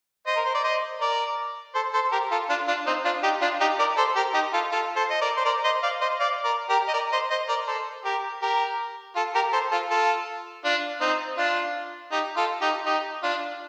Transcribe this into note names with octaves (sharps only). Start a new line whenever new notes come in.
C5 D#5
A#4
C5
D5
C5 D#5
A#4 D5
A4 C5
A4 C5
G4 A#4
F4 A4
D4 F4
D4 F4
C4 D#4
D4 F4
D#4 G4
D4 F4
D#4 G4
A#4 D5
A4 C5
G4 A#4
D#4 G4
F4 A4
F4 A4
A4 C5
D#5
A#4 D5
C5
A#4 D5
C5 D#5
D5 F5
C5 D#5
D5 F5
A#4 D5
G4 A#4
D#5
A#4 D5
C5 D#5
C5 D#5
A#4 D5
A4 C5
G4 A#4
G4 A#4
F4 A4
G4 A#4
A4 C5
F4 A4
F4 A4
D4 F4
C4 D#4
D4 F4
D#4 G4
F4 A4
D#4 G4
D#4 G4
D4 F4